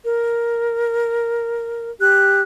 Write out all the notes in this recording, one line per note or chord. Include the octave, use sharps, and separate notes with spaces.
A#4
G4 F#6